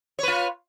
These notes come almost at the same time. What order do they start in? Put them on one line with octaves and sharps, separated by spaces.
C#5 B4 F4